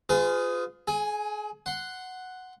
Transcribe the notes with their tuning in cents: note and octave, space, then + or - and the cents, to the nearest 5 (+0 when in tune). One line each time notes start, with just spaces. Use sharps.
F4 +10 G#4 +0 B4 +45
G#4 +35 G#5 +0
F#5 +0 C6 -10